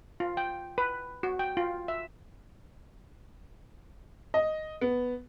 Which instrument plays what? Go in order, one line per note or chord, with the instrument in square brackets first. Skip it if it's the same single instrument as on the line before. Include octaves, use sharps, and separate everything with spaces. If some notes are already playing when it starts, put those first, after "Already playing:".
[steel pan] F4
G5
B4
F#4
G5
F4
E5
[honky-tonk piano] D#5
B3